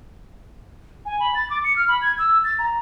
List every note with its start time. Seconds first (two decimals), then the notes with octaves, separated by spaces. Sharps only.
1.05 G#5
1.20 B5
1.35 A6
1.50 D6
1.64 C#7
1.76 F6
1.88 B5
2.02 G#6
2.19 E6
2.44 A6
2.59 A#5